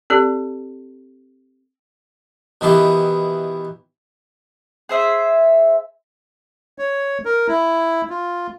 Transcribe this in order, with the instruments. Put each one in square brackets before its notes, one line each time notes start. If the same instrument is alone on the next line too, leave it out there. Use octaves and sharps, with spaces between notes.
[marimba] C4 G4 A4 D5
[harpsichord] B2 D#3 E3 E4 G4
[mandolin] G#4 C5 E5
[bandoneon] C#5
A#4
E4
F4